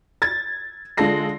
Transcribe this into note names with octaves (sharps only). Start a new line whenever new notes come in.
G#6 A6
D3 G#3 F4 A4 A#6 C7